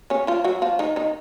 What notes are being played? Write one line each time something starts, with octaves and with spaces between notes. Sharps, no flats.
C#3 C#4
F3 F4
F#3 F#4
F3 F4
D#3 D#4
D#3 D#4